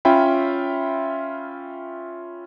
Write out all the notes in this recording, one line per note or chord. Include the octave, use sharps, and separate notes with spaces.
C#4 F4 E5 G5 B5